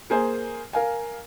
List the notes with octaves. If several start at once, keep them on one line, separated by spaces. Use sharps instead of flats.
A#3 G#4 C5 G#5
A#4 F5 G#5